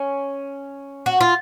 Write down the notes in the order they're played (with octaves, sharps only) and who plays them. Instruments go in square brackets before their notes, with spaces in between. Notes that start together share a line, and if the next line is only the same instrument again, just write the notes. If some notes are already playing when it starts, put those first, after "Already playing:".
Already playing: [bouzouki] C#4
F#4
F4